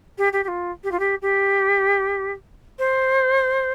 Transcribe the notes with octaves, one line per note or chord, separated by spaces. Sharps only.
G4
G4
G4
F4
G4
F4
G4
G4
C5